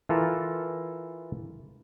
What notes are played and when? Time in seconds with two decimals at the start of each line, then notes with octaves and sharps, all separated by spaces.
0.09 E3 F4 A4 A#4